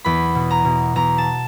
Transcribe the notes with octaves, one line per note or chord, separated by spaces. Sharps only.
E2 B5
B2
A#5
B2
E2 A#5
A5